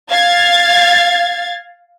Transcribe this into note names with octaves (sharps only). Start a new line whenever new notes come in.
F5 G#6 A6